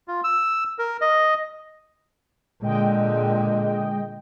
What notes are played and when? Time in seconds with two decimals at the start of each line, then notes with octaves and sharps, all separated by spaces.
0.08 F4
0.24 E6
0.79 A#4
1.01 D#5
2.62 A#2 D3 G#3 D#5 G5